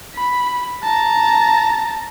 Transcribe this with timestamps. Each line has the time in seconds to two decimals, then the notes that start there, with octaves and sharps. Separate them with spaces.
0.15 B5
0.83 A5 A#5